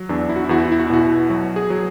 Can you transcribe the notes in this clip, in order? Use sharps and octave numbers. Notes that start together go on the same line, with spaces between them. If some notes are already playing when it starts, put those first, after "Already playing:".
Already playing: F#3
E2 D4
E4
F#4
E4
E2 F#4
E4
F#4
E4
F#4
E4
B2 F#4
E4
F#3 F#4
G#4
F#3